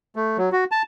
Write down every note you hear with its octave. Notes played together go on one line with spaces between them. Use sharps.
A3
F#3
F#4
A5